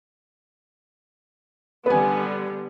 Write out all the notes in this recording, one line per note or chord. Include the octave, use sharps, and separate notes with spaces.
D3 G3 B3 B4 G#5